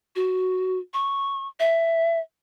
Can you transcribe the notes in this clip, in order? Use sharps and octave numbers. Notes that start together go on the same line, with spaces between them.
F#4
C#6
E5